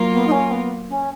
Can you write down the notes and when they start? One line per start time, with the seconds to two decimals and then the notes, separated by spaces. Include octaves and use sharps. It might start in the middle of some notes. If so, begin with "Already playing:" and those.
Already playing: F#3 A#3 F4 A#4
0.12 B3
0.27 D#4
0.32 C#4
0.51 B3
0.89 C#4